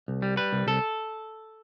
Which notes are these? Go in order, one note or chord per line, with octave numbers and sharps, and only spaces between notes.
C2
G3
G3 B4
C2
C2 A4